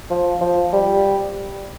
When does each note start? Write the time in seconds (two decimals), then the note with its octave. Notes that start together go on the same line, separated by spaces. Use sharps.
0.10 F3
0.41 F3
0.73 G3